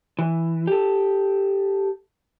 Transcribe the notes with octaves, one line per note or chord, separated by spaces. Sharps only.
E3
G4 A4